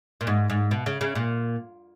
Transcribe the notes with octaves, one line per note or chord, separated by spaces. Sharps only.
A#2
G#2
G#2
B2
C#3
C#3
A#2